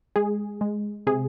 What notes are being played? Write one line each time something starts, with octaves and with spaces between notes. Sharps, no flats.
G#3 G#4
G#3
C3 G#4